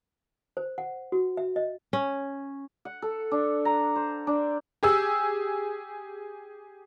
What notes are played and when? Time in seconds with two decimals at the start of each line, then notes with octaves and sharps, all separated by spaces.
0.57 C5
0.78 F#5
1.12 F#4
1.37 E5
1.56 D#5
1.93 C#4
2.85 F#5
3.02 A4
3.31 D4
3.65 A#5
3.96 C5
4.27 D4
4.83 G4 G#4 E6